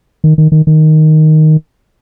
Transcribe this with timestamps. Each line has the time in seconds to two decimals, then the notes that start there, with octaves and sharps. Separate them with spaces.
0.24 D#3
0.38 D#3
0.52 D#3
0.67 D#3